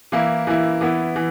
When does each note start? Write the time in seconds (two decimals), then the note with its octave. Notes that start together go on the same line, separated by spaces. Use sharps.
0.12 E3 A#3 E4
0.47 E3 A#3 E4
0.81 E3 B3 E4
1.16 E3